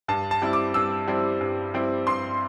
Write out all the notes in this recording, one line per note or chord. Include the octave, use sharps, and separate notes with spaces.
G2 A5
A5
G3 C4 E4
D6
G2 E6
G3 C4 E4
G2
G3 C4 E4
G2 C6